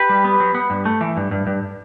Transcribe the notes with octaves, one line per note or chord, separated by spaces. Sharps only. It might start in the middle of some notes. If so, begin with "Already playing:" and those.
Already playing: G4 B4
G3
B3
F#3
B3
G2
A3
E3
G2
G2
G2